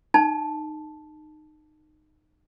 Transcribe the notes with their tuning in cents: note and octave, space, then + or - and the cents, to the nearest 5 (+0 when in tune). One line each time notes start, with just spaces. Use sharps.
D#4 -20 A5 -5